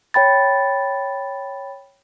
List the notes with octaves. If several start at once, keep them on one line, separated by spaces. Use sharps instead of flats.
C#5 G5 B5 A6